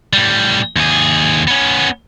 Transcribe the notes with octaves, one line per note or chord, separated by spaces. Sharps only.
A2 G3
D#2 G#4
B3 C#4